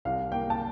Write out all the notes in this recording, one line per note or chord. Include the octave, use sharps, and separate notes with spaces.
C2 F5
A#3 G5
A5